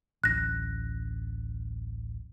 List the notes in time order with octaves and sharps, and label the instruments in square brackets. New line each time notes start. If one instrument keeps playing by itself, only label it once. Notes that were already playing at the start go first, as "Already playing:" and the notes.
[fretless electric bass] D1 A1 [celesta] F#6 A#6